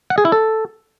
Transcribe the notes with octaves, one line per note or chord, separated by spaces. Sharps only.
F#5
G#4
E4
A4